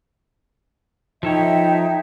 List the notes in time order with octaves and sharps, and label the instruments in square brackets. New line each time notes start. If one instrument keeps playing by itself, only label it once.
[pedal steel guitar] F3 A4 C#5 [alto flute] D#4 [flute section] E5 G5